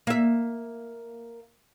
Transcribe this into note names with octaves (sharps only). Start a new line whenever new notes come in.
A#3 E5